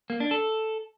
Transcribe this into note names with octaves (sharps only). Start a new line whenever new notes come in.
A#3
D4
A4